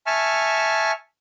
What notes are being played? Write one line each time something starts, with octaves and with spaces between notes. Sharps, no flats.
E5 G#5 A5 C#6 F6